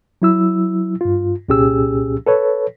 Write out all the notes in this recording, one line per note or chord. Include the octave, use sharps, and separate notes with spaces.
F#3 E4 E6
G2 F4
C2 A#2 C#4 G4 G#4 E6
A4 B4 C#5